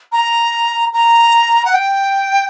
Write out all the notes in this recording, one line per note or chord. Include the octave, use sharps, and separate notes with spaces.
A#5
A#5
F#5
G5